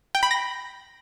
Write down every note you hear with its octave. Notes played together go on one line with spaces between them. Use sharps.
G5
B5
A#6